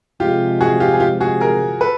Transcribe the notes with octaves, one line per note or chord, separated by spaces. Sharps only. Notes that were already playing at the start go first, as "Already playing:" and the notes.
C3 F3 G#3 F4 G4
F#4 G#4
F4 G4
G#4
F4 G4
F#4 G#4
G#4 A#4
A4 B4